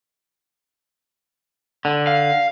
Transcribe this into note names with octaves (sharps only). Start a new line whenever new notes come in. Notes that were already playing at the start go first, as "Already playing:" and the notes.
D3
F5